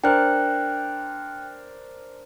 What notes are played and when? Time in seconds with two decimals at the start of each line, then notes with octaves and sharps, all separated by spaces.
0.04 D4 A#4 C5 G5 F#6